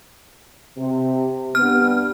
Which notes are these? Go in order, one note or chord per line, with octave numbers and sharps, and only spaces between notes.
C3
G2 B3 F6